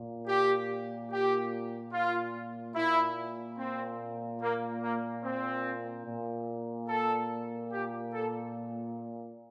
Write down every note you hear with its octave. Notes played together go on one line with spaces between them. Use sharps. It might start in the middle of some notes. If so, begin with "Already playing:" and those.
Already playing: A#2
G4
G4
F4
A#2 E4
C4
A#3
A#3
C4
A#2
A4
G4
A4